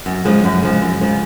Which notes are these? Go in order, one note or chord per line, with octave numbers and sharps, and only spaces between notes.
F#2
C#3 F3 G#3
F#2
C#3 F3 G#3
F#2
C#3 F3 G#3